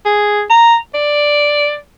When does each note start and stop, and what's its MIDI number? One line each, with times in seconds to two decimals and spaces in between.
0.05 0.43 68
0.50 0.77 82
0.94 1.77 74